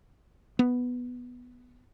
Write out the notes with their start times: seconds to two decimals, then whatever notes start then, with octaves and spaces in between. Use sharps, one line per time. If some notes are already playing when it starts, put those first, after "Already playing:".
0.59 B3